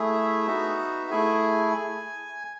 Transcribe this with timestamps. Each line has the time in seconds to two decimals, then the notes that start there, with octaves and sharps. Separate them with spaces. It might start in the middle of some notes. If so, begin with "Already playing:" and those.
Already playing: A3 E4 G#4 E5
0.47 B3 D#4 F#4
1.11 A3 E4 G#4 G#5